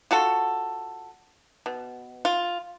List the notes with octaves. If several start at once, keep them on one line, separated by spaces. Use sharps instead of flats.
F4 F#4 A4
B2
F4